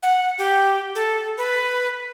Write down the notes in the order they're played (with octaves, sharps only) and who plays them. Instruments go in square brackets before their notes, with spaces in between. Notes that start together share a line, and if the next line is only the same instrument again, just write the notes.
[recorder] F#5
G4
A4
B4